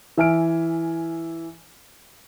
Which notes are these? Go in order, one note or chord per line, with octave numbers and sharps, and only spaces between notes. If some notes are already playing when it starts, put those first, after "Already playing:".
E3 E5 G#5 F6 D7